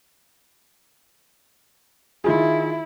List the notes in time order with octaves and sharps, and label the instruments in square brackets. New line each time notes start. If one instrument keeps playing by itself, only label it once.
[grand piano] D#3 F4 G#4 [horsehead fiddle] E4